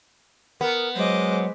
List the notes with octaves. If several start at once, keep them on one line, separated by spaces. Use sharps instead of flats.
B3 A#4
F#3 G#3 C5 D#5 D6